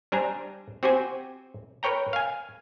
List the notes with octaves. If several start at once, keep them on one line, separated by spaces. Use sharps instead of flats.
G3 D4 C5 G#5 A#5
C4 F#4 G4 C5 G#5
A#4 B4 C#5 G5 A#5
F5 G#5